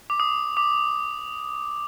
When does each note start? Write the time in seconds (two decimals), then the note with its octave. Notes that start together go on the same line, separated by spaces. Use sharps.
0.10 D6
0.20 D#6
0.57 D6